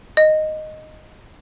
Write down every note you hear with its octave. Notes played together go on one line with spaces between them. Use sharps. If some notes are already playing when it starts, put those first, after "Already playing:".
D#5